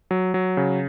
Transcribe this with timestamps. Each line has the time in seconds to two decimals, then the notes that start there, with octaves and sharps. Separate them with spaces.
0.11 F#3
0.34 F#3
0.57 C#3